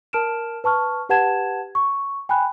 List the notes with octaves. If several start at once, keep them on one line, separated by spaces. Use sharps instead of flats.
A#4 A5 F6 D7 E7
B4 A5 C#6 F6
G4 B4 F#5 A5 G#6 E7
C#6
G5 G#5 B5 F#6